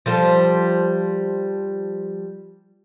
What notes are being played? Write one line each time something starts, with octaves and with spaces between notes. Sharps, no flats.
F3 G3 A4